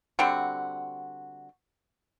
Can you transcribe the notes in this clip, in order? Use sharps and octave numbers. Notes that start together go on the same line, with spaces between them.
D3 G3 C4 F#4